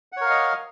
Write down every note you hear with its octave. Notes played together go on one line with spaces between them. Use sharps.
A#4 C#5 D#5 F5 F#5